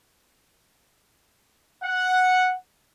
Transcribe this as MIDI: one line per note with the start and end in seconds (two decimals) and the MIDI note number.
1.84 2.55 78